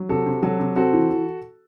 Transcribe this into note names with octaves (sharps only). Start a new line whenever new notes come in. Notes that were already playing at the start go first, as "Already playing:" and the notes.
Already playing: F#3
C3 F#4 A4
C3
F#3 F#4 A4
C3
C4 F#4 A4
E3
E3